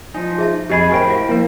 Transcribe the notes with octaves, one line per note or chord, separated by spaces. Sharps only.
F3 D#4 G#5
G#4 E5 A5
F2 G4 G#4 D#5 B5
A2 G4 A#4 C5 G5 B5
E4 F5
F3 A#3 E4 A#4